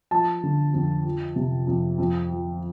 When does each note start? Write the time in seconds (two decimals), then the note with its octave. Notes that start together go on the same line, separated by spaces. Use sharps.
0.11 F3 A5
0.43 D3
0.74 F2
1.05 F3
1.36 C3
1.67 F2
1.98 F2
2.30 F3